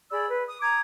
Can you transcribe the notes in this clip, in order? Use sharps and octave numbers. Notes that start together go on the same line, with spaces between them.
G#4 D5 B5 E6
B4
D#6
A#5 D6 D#6 G#6